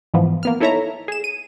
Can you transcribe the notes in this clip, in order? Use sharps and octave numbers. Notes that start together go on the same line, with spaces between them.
G#2 E3 F3 B3
A#3 B3 F6
D#4 E4 A4 C#5 E5 A#5
G#4 E7
D#7